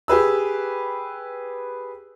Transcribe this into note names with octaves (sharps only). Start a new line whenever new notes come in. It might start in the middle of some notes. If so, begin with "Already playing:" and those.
G4 G#4 B4 E6